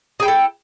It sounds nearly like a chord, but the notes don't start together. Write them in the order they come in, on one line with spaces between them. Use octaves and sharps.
G#4 G5 E4 A4